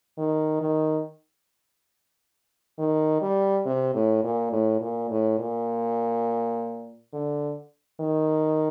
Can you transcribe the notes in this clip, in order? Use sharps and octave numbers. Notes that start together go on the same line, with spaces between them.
D#3
D#3
D#3
G3
C3
A2
A#2
A2
A#2
A2
A#2
D3
D#3